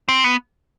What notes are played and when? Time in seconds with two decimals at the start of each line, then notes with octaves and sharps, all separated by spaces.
0.09 C4
0.24 B3